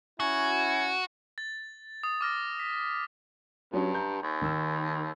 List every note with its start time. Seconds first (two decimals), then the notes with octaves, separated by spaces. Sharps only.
0.20 C#4 E4 F#4 G#5
1.38 A6
2.03 D#6
2.21 D6 F6 A#6
2.59 B6
3.73 G2 F#3 C#4 D4
3.93 A#5 G6
4.23 D#2
4.42 D#3 E6